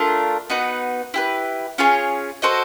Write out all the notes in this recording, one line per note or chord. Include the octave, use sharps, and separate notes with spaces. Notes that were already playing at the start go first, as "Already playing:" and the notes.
Already playing: A3 D4 F4 A#4
B3 D#4 F#4 B4
E4 G4 B4
C#4 F4 G#4 C#5
F#4 A4 C5 D#5